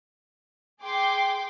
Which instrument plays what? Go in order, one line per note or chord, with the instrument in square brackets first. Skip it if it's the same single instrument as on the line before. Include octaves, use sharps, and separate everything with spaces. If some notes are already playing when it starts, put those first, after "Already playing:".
[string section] G#4 G5 C6 D6